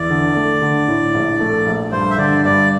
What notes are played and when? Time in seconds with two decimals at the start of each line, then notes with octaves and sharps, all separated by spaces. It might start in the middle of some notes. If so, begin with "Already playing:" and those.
Already playing: E2 D5
0.10 D3
0.35 A3
0.61 D3
0.88 A2
1.14 A#1
1.40 A3
1.66 A#1
1.92 G2 C5
2.11 E5
2.18 D3 D5
2.45 G2 D5